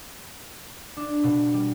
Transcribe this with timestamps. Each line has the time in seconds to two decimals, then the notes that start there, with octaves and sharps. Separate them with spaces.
0.97 D4
1.23 B2
1.54 G3